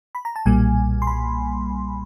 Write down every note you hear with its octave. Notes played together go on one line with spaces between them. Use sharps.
B5
A#5
A5
B1 A#2 G3 A#3 G#5
C6
B5